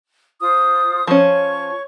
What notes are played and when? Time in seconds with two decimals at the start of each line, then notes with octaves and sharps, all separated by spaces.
0.40 F4 C5 D#6
1.07 F3 C#4 C#5 C#6